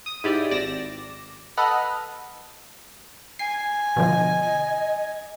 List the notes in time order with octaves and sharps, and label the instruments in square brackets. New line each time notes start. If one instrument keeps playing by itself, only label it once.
[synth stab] D#6
G#2 E4 G4 D5
G#1 D5 A#6 E7
A4 B4 D#5 F#5 B5 F6
[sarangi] G#5 [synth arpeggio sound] C7
[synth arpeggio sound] B2 D3 F3 [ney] D#5